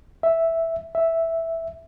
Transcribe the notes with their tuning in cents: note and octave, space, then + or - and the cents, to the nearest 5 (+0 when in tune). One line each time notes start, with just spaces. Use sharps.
E5 +0
E5 +0